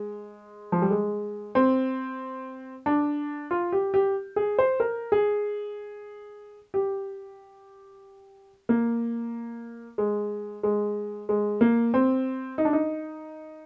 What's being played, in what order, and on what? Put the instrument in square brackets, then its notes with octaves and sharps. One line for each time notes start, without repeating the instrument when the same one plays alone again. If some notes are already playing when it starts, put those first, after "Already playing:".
Already playing: [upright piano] G#3
F3
G3
G#3
C4
D4
F4
G4
G4
G#4
C5
A#4
G#4
G4
A#3
G#3
G#3
G#3
A#3
C4
D#4
D4
D#4